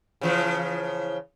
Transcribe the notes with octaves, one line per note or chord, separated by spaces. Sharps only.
C#3 E3 F3